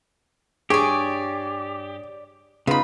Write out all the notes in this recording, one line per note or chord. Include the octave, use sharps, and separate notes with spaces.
G2 G4 G#4 C#5 D5 G#5
C#3 B3 D#4 F4 B5